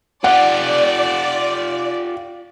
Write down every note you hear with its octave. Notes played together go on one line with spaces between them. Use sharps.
F4 G4 D5 F#5